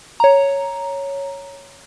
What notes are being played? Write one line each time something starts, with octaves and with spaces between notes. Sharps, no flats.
C#5 A#5